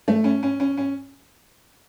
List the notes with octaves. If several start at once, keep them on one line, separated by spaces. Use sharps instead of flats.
A3
C#4
C#4
C#4
C#4